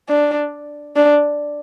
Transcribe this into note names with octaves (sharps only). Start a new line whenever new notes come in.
D4
D4